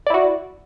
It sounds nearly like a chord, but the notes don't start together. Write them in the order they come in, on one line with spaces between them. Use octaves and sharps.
D5 E4 F#4